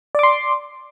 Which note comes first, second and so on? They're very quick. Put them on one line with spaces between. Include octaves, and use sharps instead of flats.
D5 D6 C6